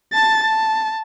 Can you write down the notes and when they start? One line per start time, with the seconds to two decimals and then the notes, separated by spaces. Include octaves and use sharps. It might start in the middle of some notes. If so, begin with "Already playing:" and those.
0.13 A5 A6
0.44 A5